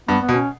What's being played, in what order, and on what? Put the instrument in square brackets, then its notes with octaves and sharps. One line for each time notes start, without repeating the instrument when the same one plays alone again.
[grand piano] G2 [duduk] B3
[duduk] B3
[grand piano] B2
[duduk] C#4